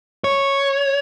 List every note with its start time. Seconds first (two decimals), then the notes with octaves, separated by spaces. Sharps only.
0.24 C#5